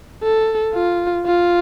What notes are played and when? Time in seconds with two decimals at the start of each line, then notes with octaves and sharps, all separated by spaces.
0.23 A4
0.75 F4
1.27 F4